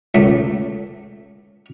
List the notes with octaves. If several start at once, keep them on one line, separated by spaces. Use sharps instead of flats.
C#2 A3